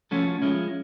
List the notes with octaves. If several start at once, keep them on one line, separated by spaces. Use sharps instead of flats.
F3 A3 C#4 F#4 A4
F3 G#3 C#4 E4